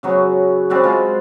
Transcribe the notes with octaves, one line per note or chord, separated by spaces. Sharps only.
C#3 F#3 B3 F#4
G3 C4 F#4 B4
G#3 F4 C5